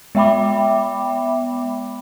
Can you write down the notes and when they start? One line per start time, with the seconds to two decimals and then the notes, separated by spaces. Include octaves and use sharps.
0.15 G#3 B3 E5 G5 B5 D6